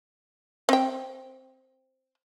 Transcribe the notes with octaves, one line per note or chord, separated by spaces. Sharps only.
C4 G5